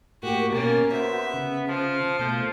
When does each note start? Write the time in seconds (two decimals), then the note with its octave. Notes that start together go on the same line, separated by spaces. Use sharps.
0.23 A2 A#3 F#4 G4
0.52 B2 A#3 C#4 A5 D6
0.92 B3 F#4 C5 E5
1.34 C#3
1.68 F3 C5
2.19 B2 F3 A3 G6